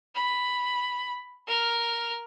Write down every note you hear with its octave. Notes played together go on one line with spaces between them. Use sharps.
B5
A#4 F6